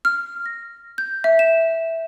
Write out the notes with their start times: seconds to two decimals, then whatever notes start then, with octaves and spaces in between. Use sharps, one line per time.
0.05 F6
0.46 A#6
0.98 G6
1.24 E5
1.39 E7